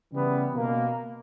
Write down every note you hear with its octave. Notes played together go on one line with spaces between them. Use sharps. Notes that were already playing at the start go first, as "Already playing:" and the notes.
C#3 E3 G3 B3
B2 A#3